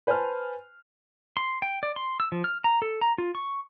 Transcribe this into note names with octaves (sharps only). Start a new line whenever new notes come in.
B4 C5 G#5 A5 F6
C6
G5
D5
C6
E6
F3
F6
A#5
A4
A#5
F4
C#6